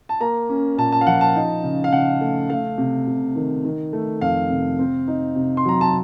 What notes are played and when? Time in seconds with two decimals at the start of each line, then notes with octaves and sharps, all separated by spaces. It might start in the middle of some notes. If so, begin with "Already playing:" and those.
0.09 A5
0.21 A#3 A#5
0.49 C#4
0.77 A#2 A5
0.92 A5
1.01 F5
1.07 F3 F#5
1.21 A5
1.35 D#4
1.64 C#3
1.84 F5
1.93 C#3 F#5
2.21 A3
2.50 A3 F5
2.78 C3
3.07 C3
3.36 D#3
3.65 D#3
3.93 A3
4.21 F2 F5
4.50 C3
4.79 C4
5.08 D#4
5.36 C3
5.57 C6
5.65 F#3 A#5
5.81 A5